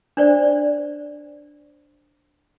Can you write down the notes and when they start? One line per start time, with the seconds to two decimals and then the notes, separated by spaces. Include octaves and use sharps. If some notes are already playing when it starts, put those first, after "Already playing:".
0.17 D4 C5 D5